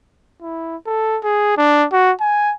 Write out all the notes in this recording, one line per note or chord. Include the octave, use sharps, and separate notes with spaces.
E4
A4
G#4
D4
F#4
G#5